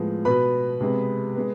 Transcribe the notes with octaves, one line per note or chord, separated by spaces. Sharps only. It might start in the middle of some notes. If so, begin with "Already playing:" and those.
Already playing: A2 F3 G#3 B3
B2 B3 B4 B5
C3 G#3 B3
G#3 B3